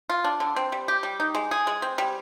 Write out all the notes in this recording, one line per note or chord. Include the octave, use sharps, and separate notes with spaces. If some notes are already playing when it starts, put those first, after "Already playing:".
F4
D4
D3
C4
G3
G4
G3
D#4
G#3
G#4
G#3
C4
G3